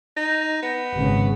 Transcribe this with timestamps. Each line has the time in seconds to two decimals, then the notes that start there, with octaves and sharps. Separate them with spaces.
0.16 D#4
0.62 B3
0.94 G#1 C#3